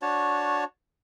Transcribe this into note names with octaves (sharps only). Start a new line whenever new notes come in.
D4 F#4 C#5 A5